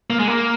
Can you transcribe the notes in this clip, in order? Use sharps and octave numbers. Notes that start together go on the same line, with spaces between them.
A#3
G#3
A#3